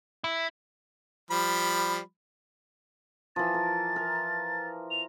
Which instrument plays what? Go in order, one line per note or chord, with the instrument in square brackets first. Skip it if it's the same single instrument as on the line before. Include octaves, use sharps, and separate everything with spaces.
[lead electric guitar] E4
[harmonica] F3 G3 B5
[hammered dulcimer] E3 F3 [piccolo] A6
[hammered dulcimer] A#4
A#4
[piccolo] F7